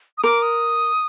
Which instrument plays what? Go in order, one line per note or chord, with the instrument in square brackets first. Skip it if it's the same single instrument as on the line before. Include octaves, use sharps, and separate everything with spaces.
[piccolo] D#6
[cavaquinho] A#4 [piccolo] D6
[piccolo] D#6